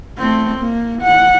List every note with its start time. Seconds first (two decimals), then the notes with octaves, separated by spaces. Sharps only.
0.18 A3 C4
0.59 A#3
1.02 F#5